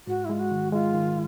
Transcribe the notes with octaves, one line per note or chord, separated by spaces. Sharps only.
G#2 F#4
E4
G#3 F4
F#4
D#3
G#3 F4
D#3